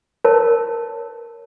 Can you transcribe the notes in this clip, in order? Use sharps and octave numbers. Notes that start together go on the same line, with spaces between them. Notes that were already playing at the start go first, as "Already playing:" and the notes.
A#4 C#5 A5